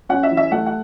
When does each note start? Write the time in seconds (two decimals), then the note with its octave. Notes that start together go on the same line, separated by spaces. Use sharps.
0.09 C#4 F#5
0.23 E5
0.31 E3
0.37 E5
0.51 A3 F#5
0.66 F#5